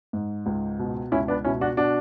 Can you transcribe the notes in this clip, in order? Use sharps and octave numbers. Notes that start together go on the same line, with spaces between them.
G#2
C#2
B2
C#2 C#4 E4
B3 D4
B2 C#4 E4
D4 F#4
B2 D4 F#4